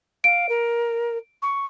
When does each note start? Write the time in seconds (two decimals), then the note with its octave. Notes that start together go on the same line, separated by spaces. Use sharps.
0.24 F5 D7
0.49 A#4
1.42 C#6